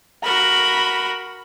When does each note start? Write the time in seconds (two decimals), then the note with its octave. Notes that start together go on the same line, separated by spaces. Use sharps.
0.24 F#4 A#4 B5